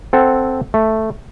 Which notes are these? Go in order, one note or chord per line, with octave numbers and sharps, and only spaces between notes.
C4 A4 F#5
A3